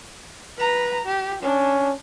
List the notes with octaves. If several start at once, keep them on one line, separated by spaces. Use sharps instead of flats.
B4 A#5
G4
C#4 D4